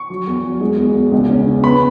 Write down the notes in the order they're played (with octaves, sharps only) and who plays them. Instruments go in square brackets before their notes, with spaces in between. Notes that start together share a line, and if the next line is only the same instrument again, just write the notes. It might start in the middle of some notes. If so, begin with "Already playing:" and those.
Already playing: [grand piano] C#6
F#3
E2
F#3
G#3
E2
E2
C#2
C#4
C#3
B3 B5